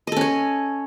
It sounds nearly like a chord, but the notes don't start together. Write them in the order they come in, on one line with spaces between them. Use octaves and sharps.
D#5 A4 C#4 C#5